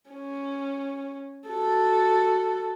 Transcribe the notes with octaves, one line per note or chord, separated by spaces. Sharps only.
C#4
F#4 A4